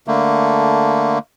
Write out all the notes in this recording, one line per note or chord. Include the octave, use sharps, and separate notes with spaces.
D3 A3 A#3